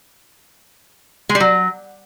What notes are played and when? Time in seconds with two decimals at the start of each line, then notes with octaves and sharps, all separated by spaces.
1.29 G#3
1.35 G3
1.40 F#3